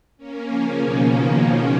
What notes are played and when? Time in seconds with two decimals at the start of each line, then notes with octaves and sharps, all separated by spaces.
0.17 A#3 C#4
0.48 C#3 F3
0.78 B2 D#3